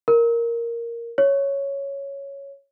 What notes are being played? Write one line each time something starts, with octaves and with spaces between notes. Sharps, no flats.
A#4
C#5